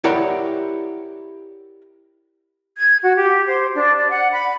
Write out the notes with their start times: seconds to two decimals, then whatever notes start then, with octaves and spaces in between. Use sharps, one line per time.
0.04 E4 G4 A#4 C#5 D5 F#5
2.77 G#6
3.03 F#4
3.17 G4
3.46 C5
3.75 D4
3.97 D5
4.11 F#5
4.32 B5